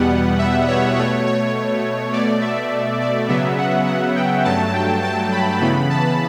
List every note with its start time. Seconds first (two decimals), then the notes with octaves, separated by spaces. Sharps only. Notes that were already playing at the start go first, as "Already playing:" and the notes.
Already playing: E2 B2 G3 B3 F#5
0.39 E5
0.68 C#5
0.97 B2 A3 C#5
1.26 C#5
2.12 B2 A3 D5
2.41 E5
3.00 D5
3.29 C#3 F#3 B3 E5
3.58 F#5
3.87 F#5
4.16 G5
4.44 G2 F#3 A3 A5
4.73 G5
5.03 A5
5.32 B5
5.60 C#3 E3 B3 B5
5.90 A5